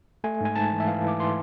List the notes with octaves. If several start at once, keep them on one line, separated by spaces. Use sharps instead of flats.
A3 G#5
G#2 G#5
G#2 A5
E3
E5
E3 F5
E3 D6
E3 C6